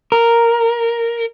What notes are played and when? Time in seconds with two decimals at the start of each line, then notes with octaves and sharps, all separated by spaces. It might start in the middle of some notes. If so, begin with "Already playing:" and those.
0.12 A#4